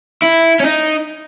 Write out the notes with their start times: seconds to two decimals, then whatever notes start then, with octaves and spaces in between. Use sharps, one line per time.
0.22 E4
0.60 C#4
0.65 D#4